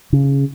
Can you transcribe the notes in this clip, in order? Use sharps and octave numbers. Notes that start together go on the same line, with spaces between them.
C#3